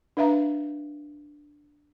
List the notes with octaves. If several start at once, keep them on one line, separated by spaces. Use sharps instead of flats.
D4 B4 E5 F5 A#5